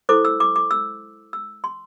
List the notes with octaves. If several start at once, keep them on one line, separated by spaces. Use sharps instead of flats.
E4 A4 C5 D6
E6
D6
D6
E6
E6
C6